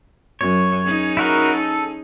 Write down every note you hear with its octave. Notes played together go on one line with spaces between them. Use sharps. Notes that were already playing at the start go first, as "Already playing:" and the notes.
F#2 C#5
C#4 D#4 G#4
E4 F#4 A#4
A4